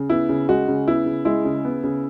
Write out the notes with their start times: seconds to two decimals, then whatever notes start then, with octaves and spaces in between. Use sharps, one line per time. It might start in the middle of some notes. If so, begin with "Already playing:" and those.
Already playing: C#3
0.10 B3 E4
0.29 C#3
0.49 G#3 F#4
0.68 C#3
0.87 B3 E4
1.06 C#3
1.25 G#3 E4
1.45 C#3
1.65 B3
1.84 C#3